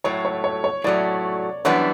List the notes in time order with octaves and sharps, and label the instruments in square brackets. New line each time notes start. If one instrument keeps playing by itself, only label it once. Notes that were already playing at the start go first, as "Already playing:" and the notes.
[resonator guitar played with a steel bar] A2 F#3 A3 [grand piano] C#5
[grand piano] C#5
C#5
C#5
[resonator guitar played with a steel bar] A2 F#3 A3 [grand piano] D5
[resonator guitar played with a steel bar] F#2 E3 G3 B3 D4 [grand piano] C#5